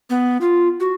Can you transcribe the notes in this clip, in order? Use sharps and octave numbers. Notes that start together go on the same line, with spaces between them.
B3
F4
F#4